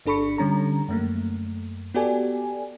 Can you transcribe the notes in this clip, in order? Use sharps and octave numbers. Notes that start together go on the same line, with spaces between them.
G1 D4 A4 B5 C#6 C#7
D3 G3 C#4 A#5
F#2 A3 A#3
B3 F#4 G4 A4 D5 G#5